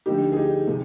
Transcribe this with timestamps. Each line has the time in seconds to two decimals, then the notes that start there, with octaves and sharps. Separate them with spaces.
0.06 D2 D3 F3 D#4 G4
0.32 G#4
0.37 D#4 G4
0.67 C3 F3